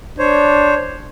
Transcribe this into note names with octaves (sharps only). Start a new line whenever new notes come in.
D4 C5 C#5